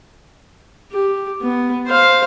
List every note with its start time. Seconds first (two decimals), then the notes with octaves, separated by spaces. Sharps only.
0.92 G4
1.42 B3
1.87 C5 F5